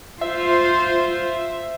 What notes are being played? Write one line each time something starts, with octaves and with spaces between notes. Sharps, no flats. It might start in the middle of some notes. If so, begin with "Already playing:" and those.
F4 C5 E5